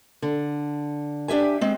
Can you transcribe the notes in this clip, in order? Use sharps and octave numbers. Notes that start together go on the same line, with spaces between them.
D3
D4 G4 E5 G#5
G#3 C4